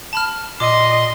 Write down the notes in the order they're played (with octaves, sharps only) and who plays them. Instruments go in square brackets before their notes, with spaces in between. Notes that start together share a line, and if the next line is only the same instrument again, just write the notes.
[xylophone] A5 B5 F6
[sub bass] A#2 [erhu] D#5 [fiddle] C6 [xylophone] D6